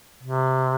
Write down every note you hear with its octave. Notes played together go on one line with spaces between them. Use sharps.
C3